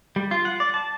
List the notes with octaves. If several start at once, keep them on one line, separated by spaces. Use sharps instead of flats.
G3
F4
F#5
D5
A5